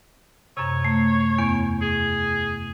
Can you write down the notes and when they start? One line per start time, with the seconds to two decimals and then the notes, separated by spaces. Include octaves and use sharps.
0.57 F#2 C3 C#5
0.85 A3
1.38 E2 B3
1.81 G#4